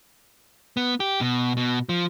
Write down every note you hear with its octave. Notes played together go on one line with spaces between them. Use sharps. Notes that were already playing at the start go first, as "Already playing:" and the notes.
B3
G4
B2
B2
F3